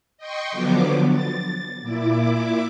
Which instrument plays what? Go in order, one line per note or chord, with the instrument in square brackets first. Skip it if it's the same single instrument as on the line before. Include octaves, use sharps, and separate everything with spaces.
[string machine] D#5 G5 C6 C#6
D3 F3 F#3 B3 D6
A6
A#2 E4 D6